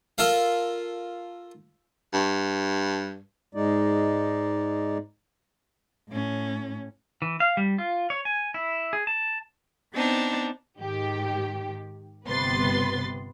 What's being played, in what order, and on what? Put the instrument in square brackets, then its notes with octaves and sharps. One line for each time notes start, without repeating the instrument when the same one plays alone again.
[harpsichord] F4 A4 A#4 F5
[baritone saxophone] G2
[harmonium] G#2 G#3 D#4 D5
[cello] A2 C#4
[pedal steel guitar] E3
F5
G3
F4
C#5
G#5
E4
G#4
A5
[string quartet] B3 C4 D4 D#4
[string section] G#2 D#3 G4
G1 C3 B3 B4 C6 A6